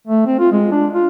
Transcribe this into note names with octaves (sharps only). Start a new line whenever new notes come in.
A3
C4
F4
G#3
D4
F4